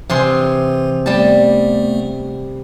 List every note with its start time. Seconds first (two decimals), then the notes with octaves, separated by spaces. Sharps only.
0.10 C3 E3 G#4 C6
1.06 G3 A3 B3 A5